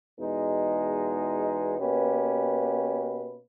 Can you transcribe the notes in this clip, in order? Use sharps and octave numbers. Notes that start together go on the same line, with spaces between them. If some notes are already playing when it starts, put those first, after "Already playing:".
E2 B2 G#3 D#4
B2 A#3 C#4 G4 B4